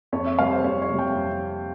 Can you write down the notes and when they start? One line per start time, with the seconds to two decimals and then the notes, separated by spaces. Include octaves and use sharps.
0.13 F2 C#5
0.26 E5
0.38 C3 G3 F5
0.51 C5
0.64 F2 C#5
0.82 C#5
0.90 C3 G3
0.99 G5
1.16 F2